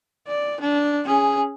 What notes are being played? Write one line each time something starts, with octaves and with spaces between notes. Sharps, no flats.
D5
D4
C#4 G#4